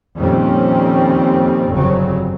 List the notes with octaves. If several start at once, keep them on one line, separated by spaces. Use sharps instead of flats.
F2 A#2 D#3 G3 C4 C#4
G1 F2 C#3 F#3 C4